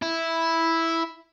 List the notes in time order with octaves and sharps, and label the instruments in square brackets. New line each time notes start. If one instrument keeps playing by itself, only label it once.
[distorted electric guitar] E4